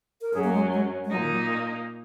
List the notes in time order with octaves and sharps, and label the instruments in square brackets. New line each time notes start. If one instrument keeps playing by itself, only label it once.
[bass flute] A#4
[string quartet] F#2 F#3 C#4 [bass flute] G#4
[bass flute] A#3
G#3
G#3
G#3
[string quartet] A#2 A#3 D#4 [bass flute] F#3
[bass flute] D#3
F#3